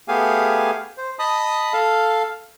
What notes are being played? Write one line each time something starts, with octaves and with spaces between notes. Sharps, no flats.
A3 B3 G4 G#4 F5 G#5
C5
D#5 A5 B5 D#6
A4 F5